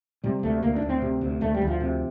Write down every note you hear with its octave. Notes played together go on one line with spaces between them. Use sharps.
C3 G3
D2 A3
D2 A#3
D4
D2
C4
C3
D2
D2 A3
G3
D2
F3
C3